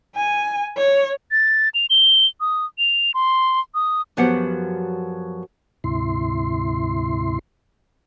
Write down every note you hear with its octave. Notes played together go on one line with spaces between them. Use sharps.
G#5
C#5
A6
F7
G7
D#6
F7
C6
D#6
F#2 F3 F#3 B3 G4 F#5
D2 G#2 C3 E4 C6